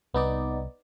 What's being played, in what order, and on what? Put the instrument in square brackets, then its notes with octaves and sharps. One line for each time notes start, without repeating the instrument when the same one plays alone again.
[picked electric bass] C2 [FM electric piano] B3 D#4 D5